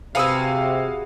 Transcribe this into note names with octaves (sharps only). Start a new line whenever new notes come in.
C3 F#4 G#4 B4 F5 D#6 E6